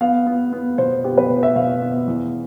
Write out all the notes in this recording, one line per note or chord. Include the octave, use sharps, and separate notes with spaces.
B3 F5
B3
B3
B2 C5
B3 G4
B4
B2
E5
B2 F5
B3
E2